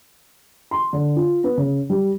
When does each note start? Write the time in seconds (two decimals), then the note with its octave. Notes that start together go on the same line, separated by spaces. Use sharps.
0.71 C6
0.93 D3
1.16 F4
1.44 B3
1.57 C#3
1.90 G3